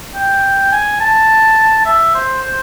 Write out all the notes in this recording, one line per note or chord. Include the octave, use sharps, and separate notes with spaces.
G5
G#5
A5
E5
C5
C5